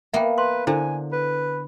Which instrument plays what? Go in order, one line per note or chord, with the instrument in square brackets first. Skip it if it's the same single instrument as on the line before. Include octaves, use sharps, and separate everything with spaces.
[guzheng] A#3 B3 [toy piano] E5 G5
[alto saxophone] B4 [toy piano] C6
[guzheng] D3 [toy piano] E4 A4 C5 [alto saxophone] G#5
[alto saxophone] B4